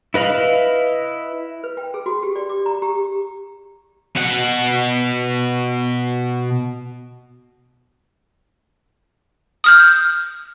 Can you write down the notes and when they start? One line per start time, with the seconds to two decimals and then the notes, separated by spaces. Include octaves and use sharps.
0.14 E4 B4 D#5 F5 B5
1.64 B4
1.77 G5
1.94 G#4
2.06 F#4
2.23 G4
2.36 D5
2.49 D6
2.66 A#5
2.82 G4
4.16 B2 F#5
9.64 D#6 F6 G6